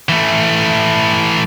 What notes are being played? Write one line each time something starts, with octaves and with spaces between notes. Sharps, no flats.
E3 A3